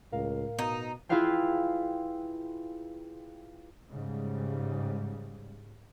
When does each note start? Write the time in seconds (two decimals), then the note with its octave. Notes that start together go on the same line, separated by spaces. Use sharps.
0.12 C#2 A2 A#4 F5
0.59 B2 D#4
1.09 E4 F4 G#4 B4 F5 G5
3.90 G#2 C#3 G3